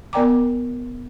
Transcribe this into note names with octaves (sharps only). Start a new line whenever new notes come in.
B3 A#4 D5 G5 A#5 D6